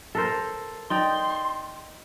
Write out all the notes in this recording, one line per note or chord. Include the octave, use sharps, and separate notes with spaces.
A4 A#4 C5
D#4 D5 G5 C6